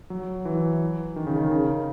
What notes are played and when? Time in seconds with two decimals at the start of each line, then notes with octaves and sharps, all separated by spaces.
0.10 F#3
0.45 E3
1.16 D#3
1.27 C#3
1.38 D#3
1.51 C#3